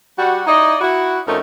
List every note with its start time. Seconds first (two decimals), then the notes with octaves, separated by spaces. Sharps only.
0.18 G3 F#4
0.46 D#4 E4 D5 D#5
0.81 E4 F#4
1.26 F2 A3 C#4 D#4 A#4